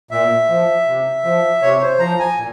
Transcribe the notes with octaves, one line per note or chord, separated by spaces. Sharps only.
A#2 E5
F3
C3
F3
C3 C#5
C5
F3 A#5
G#5
A#2